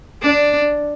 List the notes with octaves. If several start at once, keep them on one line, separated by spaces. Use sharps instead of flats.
D4